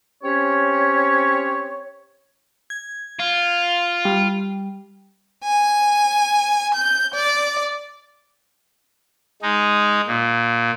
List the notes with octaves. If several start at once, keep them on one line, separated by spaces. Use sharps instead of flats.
C4 C#4 G4 C#5
G#6
F4
G3
G#5
G6
D5
G#3 D#4
A#2